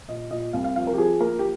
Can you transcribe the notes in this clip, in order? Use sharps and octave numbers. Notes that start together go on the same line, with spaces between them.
A#2 D#5
A#2 D#5
C2 F5
F5
F3 F5
A#4
G4
F3 G#4
A#3 A#4
G4